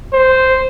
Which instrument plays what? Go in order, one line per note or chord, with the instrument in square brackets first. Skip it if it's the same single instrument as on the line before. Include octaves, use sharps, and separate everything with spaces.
[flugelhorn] C5